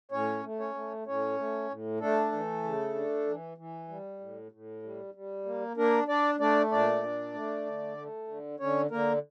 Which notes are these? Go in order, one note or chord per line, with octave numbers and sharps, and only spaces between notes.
A2 C#4 C#5
A3
C#4 C#5
A3
A2 C#4 C#5
A3
A2
A3 D4 A4
E3
C#3
D4
E3
E3
G3
A2
A2
G3
G3
A#3
A#3 D4 A#4
D4 D5
A3 D4 D5
A#2 D4 D5
D4
A3
D3
A3
D3
D3 C#4 C#5
D3 A#3 A#4